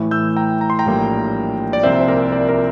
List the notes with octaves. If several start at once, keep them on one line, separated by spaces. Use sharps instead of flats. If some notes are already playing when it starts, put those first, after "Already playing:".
Already playing: A2 E3 A3
E6 G6
G5 A#5
A#5
C6
G5 A#5
A#1 A2 G3 A#3
D5
C2 A#2 F3 C4 C5 E5
C5
A#4 D5
A#4 D5
A#4 D5